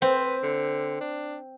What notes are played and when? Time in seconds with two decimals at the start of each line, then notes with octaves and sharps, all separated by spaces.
0.02 C4 B4
0.43 D3
1.01 D4